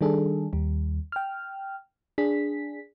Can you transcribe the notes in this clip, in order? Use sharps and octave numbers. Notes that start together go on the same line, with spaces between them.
D#3 G3 D4 G#4 A4
D#2 G3
G5 F6
D4 G#4 B6